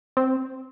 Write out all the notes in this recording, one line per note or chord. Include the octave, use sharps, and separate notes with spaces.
C4